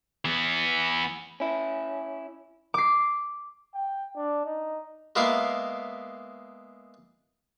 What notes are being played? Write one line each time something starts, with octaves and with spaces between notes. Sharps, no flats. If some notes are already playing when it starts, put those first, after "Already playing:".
E3 B3
C#4 E4
D6 C7
G5
D4
D#4
G#3 A#3 B3 E4 A#4 F5